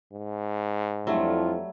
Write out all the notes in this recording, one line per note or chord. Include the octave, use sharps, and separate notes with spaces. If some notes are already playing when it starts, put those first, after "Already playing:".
G#2
F2 F#3 G3 A3 D4 E4 F4